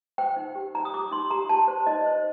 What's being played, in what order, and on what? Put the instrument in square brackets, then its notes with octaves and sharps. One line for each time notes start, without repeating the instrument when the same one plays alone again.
[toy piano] C5 G5
D#4
G4
D#4 A#5
D#6
G4 D6
D#4 C6
G4 A#5
G4 A5
C5
D#4 D#5
C5